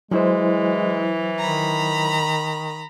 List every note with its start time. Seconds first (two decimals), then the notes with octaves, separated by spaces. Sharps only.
0.11 E3 F#3 G#3 E4 C5
1.39 D#3 A#5 B5